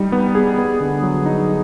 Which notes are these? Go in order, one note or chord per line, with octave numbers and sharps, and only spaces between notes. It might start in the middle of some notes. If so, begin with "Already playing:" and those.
Already playing: G3 D#4
B3
G#4
B3
D3
F#3
D#4